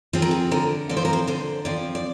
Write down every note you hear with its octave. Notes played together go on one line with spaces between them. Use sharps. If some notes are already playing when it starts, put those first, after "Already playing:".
F3 C4 G#4
A#4
G#4
D3 A#4
F3 C4 D5
C5
A#4
C5
D3 C5
F3 C4 D5
D5